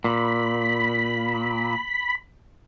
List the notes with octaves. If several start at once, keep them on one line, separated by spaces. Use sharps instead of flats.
A#2 B5